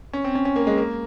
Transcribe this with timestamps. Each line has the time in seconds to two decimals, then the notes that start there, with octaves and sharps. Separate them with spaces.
0.13 C#4
0.24 C4
0.35 C#4
0.45 C#4
0.56 A#3
0.67 G#3
0.78 A#3